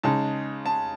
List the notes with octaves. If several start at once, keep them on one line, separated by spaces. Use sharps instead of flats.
C#3 G#3 D#4 A5
A5